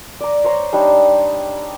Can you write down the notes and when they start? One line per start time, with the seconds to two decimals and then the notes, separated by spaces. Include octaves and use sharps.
0.21 D5 A#5
0.44 C5 C#5 A#5
0.73 G3 D4 D#4 D#6